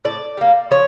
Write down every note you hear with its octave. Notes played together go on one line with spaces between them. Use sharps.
A2 D5
G3 A#3
F3 C#5